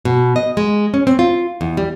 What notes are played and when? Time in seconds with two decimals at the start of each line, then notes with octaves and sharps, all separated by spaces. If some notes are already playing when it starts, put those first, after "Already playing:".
0.05 B2
0.36 D#5
0.57 G#3
0.94 C#4
1.07 C4
1.19 F4
1.61 E2
1.77 G3